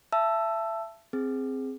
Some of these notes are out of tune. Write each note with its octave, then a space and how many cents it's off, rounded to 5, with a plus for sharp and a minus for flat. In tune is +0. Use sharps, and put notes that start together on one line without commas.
E5 +25 A5 +0 E6 +10
C4 +0 G#4 +0